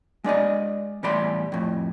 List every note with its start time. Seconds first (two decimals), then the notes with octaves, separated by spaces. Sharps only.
0.24 G#3 D4 D5 D#5
1.03 E2 A2 G3 D5 B5 C6
1.52 F2 A2